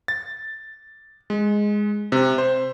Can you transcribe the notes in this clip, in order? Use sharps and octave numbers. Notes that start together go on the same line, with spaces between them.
A6
G#3
C3
C5